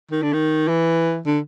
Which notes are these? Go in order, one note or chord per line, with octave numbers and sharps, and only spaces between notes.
D#3
D3
D#3
E3
D3